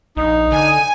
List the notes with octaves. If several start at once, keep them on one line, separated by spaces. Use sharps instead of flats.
A#1 D#4
D3 G#5